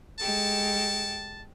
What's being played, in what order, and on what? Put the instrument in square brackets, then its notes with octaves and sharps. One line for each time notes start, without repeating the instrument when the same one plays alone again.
[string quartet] G#3 G4 A4 [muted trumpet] A5